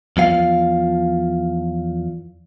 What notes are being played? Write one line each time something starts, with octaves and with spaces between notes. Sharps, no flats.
E2 F3 F5